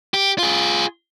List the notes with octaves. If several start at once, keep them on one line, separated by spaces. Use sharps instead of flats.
G4
F4 G#4